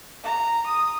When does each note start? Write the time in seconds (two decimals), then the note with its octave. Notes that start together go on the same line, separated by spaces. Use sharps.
0.23 A#5
0.66 D#6